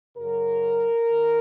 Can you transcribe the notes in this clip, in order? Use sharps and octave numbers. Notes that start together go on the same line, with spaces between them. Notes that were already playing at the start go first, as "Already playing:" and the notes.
F#2 C#3 F#3 A#4
D#3